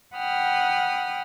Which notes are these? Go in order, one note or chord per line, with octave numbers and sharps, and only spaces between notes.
F#5 G5 B5 D#6 F6